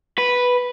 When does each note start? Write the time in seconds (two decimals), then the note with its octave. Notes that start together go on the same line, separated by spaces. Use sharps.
0.18 B4